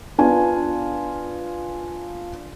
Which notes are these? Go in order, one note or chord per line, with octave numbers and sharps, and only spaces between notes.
B3 D4 F4 G#5